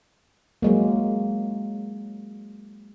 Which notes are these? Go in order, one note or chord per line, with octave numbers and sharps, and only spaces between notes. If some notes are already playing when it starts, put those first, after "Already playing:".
F#3 G#3 A#3